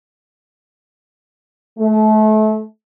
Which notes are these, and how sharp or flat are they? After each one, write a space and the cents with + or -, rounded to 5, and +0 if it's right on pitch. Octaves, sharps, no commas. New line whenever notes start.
A3 -30